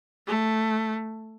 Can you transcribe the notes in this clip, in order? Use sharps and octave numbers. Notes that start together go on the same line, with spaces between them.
A3